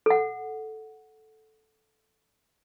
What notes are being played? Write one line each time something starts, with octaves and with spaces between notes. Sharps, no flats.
A4 F#5